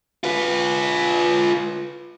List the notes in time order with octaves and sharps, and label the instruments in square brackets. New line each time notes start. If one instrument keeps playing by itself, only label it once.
[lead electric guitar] F4 B4